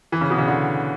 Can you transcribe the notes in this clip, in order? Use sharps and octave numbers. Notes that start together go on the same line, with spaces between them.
E3
C#3
B2
C#3
D3